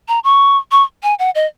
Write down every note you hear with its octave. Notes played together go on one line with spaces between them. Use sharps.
A#5
C#6
C#6
G#5
F#5
D#5